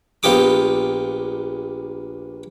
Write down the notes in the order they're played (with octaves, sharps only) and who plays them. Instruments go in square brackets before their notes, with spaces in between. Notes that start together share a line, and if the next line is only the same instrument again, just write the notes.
[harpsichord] A#1 B3 F4 G4 D6 D#6